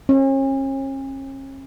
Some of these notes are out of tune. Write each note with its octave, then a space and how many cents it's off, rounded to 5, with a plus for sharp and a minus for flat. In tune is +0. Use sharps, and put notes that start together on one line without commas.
C#4 -40